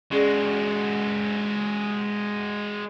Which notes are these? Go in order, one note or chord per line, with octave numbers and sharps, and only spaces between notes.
G#3 C#4 F#4 G#4 D5